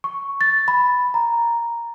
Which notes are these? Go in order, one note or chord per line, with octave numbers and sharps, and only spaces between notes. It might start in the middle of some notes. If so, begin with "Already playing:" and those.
C#6
A6
B5
A#5